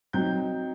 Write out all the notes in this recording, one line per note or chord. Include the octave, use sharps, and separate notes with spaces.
F#3 C4 D#4 G6